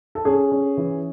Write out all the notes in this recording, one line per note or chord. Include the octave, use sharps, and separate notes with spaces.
A4
C#4 G#4
C#4
E3